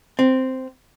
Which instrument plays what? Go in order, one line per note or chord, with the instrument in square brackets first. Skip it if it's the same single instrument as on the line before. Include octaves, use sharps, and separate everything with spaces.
[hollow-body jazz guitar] C4